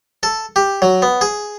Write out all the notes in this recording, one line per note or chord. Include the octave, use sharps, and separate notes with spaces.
A4
G4
F#3
B3
G#4